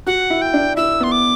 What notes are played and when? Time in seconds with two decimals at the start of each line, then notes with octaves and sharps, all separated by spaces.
0.06 F#4 F#5
0.30 E4
0.42 G5
0.54 D4
0.77 E4 E6
1.00 B3 C6
1.12 D6